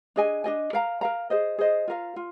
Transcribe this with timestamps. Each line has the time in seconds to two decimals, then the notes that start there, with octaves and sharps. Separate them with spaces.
0.16 D4 G#4 D#5 G#5
0.44 D4 G#4 D#5 G#5
0.73 A#4 F5 A#5
1.01 A#4 F5 A#5
1.30 G#4 C5 D#5
1.58 G#4 C5 D#5
1.88 F4 A#4 F5
2.16 F4